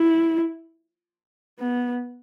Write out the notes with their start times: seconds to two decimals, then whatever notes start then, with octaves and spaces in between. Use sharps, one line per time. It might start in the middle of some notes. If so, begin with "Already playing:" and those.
Already playing: E4
1.59 B3